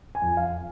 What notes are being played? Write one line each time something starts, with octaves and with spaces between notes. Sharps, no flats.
G#5
F2
F5